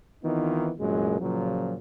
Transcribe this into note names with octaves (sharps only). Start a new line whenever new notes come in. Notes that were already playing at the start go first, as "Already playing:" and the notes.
D#3 E3 B3 C4 D#4 F4
C2 F#2 A#2 E3 G#3
A#2 C#3 F3 F#3